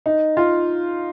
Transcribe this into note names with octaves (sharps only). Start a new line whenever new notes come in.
D#4
F4